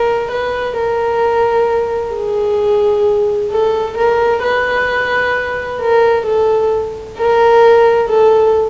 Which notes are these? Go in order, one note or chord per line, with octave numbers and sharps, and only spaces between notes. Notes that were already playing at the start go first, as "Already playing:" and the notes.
Already playing: A#4
B4
A#4
G#4
A4
A#4
B4
A#4
A4
A#4
A4